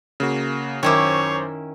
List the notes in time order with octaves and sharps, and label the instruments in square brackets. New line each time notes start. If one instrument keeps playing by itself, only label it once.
[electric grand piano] C#3 A#3 F#4
[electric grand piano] F#2 C5 [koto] D#3 C#4 E4 [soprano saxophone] C#5 [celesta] C#6 D6